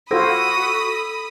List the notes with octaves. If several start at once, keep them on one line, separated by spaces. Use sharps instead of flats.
F4 F#4 A4 C5 B5 D#6 E6 A#6